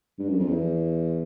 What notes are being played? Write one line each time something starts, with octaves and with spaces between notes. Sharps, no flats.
G2
F#2
F2
E2